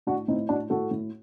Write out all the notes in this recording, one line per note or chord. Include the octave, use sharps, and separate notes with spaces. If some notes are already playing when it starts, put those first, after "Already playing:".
A2 D4 F#4
A2 C4 D#4
A2 D4 F#4
A2 F#4 A4
A2